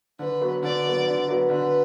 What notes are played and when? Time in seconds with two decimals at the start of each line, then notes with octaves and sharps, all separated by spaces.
0.19 D3 B4
0.41 F#3 B3
0.63 D3 D5
0.84 F#3 B3
1.06 D3
1.28 F#3 B3
1.50 D3 B4